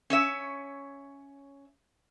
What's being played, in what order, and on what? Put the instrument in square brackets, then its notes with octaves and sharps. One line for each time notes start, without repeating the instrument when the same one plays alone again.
[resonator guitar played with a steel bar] C#4 C#5 E5